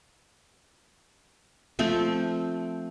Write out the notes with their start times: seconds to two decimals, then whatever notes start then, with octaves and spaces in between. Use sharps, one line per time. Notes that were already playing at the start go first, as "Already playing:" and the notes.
1.79 F3 A3 C4